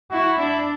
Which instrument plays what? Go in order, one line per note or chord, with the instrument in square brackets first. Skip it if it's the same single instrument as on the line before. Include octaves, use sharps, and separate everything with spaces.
[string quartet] E4 [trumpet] F#4
[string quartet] D4 [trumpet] E4